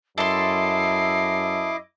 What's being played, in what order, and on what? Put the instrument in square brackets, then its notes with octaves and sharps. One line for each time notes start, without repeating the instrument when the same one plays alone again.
[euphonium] F#2 [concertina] E4 D#5 D6 [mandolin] A4 C6 [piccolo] C7